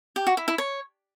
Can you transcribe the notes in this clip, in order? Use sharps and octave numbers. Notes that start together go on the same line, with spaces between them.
G4
F#4
E4
E4
C#5